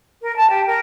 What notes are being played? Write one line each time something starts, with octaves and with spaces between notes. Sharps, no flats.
A#4
A5
G4
A#4